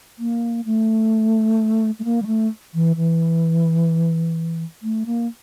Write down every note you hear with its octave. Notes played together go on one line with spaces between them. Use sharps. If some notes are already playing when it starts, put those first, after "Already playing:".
A#3
A3
A3
A#3
G3
A3
E3
E3
A3
A#3